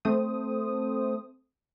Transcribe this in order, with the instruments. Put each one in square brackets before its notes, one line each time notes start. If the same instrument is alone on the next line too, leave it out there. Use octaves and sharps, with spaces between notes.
[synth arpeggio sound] A3 C4 C5 D#6